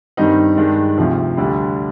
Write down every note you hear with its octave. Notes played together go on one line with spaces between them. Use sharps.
G2 D#3 G3 C4 D#4
G2 D#3 G#3 D4
D2 C3 F3
D2 D3 G3 D4